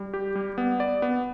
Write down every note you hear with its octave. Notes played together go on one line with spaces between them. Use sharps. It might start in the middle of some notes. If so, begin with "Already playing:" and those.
Already playing: G3
G4
G3
B3
D5
B3